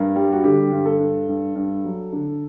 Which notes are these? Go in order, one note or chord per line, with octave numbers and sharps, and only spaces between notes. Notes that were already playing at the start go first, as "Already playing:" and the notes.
Already playing: G2 A#4
G3
F#4
D3 G4
G2
A4
G2
G2
G2
F#3
D3